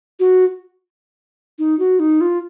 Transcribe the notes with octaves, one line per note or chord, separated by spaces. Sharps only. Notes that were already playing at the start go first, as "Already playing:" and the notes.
F#4
D#4
F#4
D#4
F4